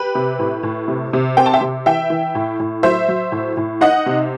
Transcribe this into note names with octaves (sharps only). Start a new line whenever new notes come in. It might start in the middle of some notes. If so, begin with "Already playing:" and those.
Already playing: G4 B4
C3
A2
A2
C3
C3
C4 G5
A5
E5 G5
C3
E3 E5 G5
E3
A2
A2
F#3 C5 E5
F#3
A2
A2
D#4 D#5 F#5
C3